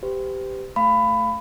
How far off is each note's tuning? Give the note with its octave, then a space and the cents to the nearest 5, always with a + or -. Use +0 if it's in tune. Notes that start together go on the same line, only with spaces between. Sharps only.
G4 +0 C5 -45
A3 +0 F5 -10 B5 +20